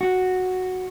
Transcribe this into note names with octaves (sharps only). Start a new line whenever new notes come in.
F#4